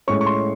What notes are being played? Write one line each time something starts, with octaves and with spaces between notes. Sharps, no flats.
A2 G#3 C#4 C#6
C#6
C6